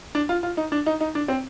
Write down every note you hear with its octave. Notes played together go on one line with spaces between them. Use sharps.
D4
F4
F4
D#4
D4
D#4
D#4
D4
C4